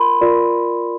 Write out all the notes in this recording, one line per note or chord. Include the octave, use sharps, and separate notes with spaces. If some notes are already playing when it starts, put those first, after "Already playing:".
Already playing: F4 A#4 B5 C6
F4 A#4 D5